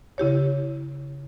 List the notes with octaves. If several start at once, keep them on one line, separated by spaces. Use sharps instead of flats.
C#3 E4 G4 C#5